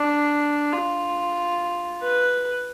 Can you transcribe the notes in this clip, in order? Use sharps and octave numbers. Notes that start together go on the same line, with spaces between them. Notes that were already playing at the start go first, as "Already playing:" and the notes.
Already playing: D4
F4
B4